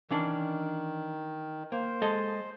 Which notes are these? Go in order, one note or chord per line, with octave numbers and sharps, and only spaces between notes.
D#3 E3 C#4 D4
A#3 C5
G#3 A4 D#5